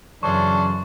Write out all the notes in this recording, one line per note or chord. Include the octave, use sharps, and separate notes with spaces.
F#2 C#3 E3 C#4 D4 A4 C6 C#6